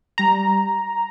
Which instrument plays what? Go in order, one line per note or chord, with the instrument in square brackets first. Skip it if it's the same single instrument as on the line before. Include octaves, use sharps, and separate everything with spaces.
[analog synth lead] G3 [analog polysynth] A#5